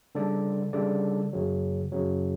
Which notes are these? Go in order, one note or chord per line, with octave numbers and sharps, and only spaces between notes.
C#3 G3 D4 A4 D5
C#3 G3 D4 A4 D5
F#2 C#3 F#3
F#2 C#3 F#3